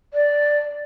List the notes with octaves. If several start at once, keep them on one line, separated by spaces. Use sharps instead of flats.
D5